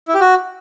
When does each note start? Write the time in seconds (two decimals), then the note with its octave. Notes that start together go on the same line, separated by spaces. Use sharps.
0.08 E4
0.14 G4
0.21 F#4